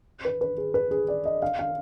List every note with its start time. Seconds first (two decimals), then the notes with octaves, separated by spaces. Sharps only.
0.25 B4
0.41 B4
0.58 G#4
0.74 B4
0.91 G#4
1.08 D5
1.25 D#5
1.42 F5
1.59 F5